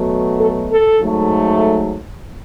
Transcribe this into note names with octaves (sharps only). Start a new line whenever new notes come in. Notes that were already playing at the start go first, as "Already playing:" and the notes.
Already playing: B2 F#3 A3
A4
A4
G#2 F#3 A3